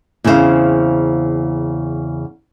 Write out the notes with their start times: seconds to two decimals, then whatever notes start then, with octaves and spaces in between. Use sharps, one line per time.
0.24 E2 C#3 C4 C#4 C5 F5